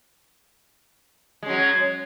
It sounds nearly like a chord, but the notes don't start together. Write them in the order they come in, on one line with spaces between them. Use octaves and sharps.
G#3 C#4 F#3